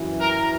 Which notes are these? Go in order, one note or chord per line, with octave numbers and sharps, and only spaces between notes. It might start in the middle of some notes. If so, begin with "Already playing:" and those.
Already playing: F#2 E3
A#4